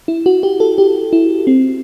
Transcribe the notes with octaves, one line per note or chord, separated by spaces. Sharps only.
E4
F#4
G4
A4
G4
E4
C4